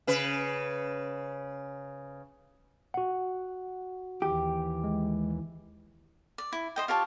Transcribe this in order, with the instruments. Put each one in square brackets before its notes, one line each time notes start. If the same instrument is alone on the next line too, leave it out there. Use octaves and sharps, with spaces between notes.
[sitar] C#3 B4
[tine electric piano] F#4 F#5
[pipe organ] D#2 E3 [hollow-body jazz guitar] G4
[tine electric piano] G#3
[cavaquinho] D5
E4
C5 D#5 G5
F4 G4 C#5 A5